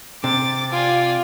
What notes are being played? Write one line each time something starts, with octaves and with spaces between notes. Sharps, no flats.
C3 D6 A6
F4 D5 G#5